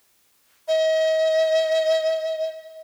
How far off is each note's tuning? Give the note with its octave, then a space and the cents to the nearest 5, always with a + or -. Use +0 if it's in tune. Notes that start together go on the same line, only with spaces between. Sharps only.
D#5 +40